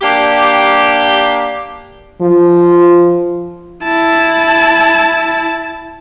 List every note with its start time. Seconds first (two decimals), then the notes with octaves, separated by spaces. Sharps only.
0.02 A#3 D4 G4
2.22 F3
3.83 E4 A5